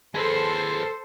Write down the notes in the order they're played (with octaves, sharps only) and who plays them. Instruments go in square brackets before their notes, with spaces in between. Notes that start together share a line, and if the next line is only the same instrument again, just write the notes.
[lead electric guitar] G#4 B4 [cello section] A4 C5